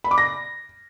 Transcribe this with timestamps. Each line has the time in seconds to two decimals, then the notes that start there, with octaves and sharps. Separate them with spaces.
0.04 B5
0.11 D6
0.18 A#6